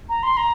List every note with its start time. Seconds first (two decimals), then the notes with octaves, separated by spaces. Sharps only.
0.09 A#5
0.23 C6
0.37 A#5